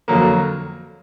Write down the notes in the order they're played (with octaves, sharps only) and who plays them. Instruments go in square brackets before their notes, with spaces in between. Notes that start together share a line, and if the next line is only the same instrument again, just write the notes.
[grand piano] F2 D3 F#3 A#3